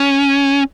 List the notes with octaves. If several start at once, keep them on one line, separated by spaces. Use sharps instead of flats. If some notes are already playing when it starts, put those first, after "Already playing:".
Already playing: C#4